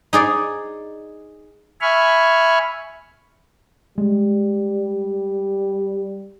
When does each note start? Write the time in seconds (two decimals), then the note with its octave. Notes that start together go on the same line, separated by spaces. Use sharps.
0.13 D#4 G#4 D5
1.81 E5 G#5 B5 C#6 F6
3.98 G3 G#3